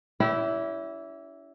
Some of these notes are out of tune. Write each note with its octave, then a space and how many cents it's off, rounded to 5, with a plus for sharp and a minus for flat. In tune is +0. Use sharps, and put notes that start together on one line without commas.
C#4 +40 E4 +0 G4 -30